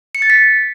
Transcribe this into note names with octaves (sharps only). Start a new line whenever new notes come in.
C#7
A6
B6